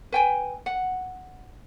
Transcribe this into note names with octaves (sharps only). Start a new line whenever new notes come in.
B4 G5 G#5
F#5